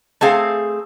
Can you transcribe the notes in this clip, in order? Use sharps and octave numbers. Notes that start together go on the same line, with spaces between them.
A3 C4 G#4 F5